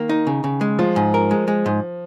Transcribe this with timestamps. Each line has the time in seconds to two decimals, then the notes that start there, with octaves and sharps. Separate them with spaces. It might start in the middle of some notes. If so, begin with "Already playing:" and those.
Already playing: D#3 A#3
0.09 D#4
0.27 C#3
0.44 C#3
0.61 G#3
0.79 F3 F4
0.96 G#2
1.14 A#4
1.31 G#3
1.48 G#3
1.66 G#2